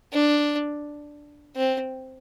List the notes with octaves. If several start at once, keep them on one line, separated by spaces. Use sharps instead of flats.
D4
C4